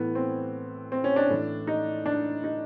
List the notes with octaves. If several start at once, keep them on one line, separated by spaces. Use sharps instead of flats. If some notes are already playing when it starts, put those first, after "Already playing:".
Already playing: A2 E3 B3
C4
C4
C#4
D4
A2 E3
D#4
D4
D#4